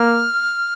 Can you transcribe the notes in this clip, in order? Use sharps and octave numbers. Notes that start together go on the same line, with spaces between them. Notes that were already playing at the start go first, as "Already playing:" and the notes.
Already playing: A#3 F6